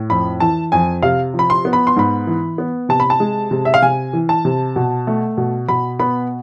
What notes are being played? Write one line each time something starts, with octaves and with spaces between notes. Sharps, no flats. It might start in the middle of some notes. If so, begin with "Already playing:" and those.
Already playing: A2
F2 B5
E3 A5
F2 G#5
C3 F5
F3
B5
C6
B3
B5
C6
G#2 B5
E3
B3
C3 A5
B5
A5
G#3
C3
E5
F5
C3 G#5
E3
A5
C3
B2
A3
B2
B2 B5
B3 B5